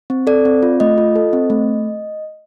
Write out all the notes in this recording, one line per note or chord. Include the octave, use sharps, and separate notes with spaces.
C4
A4 D5
C4
F4
A3 D#5
F4
A4
C4
A3